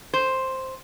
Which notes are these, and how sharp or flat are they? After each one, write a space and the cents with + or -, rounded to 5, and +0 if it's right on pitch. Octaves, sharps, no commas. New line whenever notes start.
C5 +5